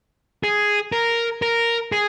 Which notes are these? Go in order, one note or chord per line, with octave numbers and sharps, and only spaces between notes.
G#4
A#4
A#4
G#4